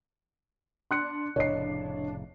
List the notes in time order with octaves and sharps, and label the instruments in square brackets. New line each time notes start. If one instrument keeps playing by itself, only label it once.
[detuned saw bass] D4 [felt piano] C6 F#6 C#7
[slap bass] F1 A2 C#3 [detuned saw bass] D4 [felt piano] C#5 D#5 C7